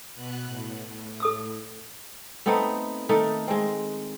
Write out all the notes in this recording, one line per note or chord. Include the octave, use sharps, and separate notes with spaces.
B2 B3 F#6
A2
A4 D#6 E6
A3 B3 C4 D#4
D#3 A3 D#4 A4
G#3 C4